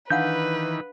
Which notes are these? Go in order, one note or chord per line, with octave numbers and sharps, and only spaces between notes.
D#3 E3 D4 B4 F5 F#5 G6